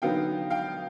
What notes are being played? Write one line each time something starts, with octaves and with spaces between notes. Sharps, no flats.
D3 F#3 B3 D#4 F5 G5
F5 G5